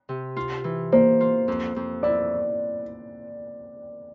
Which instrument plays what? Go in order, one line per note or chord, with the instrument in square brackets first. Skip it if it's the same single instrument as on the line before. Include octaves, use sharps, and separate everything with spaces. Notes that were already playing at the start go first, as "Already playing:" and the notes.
[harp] C3
F4
E3
[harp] A#3 [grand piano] C5
[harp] F4
F2
F2
[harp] E4 [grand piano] D5